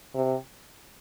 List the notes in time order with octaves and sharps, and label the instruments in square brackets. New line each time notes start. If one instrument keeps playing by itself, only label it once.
[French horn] C3